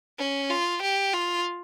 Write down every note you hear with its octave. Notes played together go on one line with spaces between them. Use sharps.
C#4
F4
G4
F4